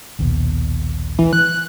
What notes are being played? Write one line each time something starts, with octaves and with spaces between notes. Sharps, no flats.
A#1 D#2 B2
E3
F#6